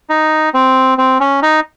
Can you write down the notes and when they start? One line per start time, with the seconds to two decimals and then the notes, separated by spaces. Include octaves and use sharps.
0.09 D#4
0.54 C4
0.98 C4
1.20 C#4
1.42 D#4